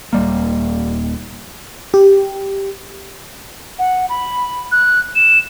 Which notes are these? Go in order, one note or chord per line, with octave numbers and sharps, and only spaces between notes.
D#1 G3 A#3
G4
F#5
B5
F#6
E7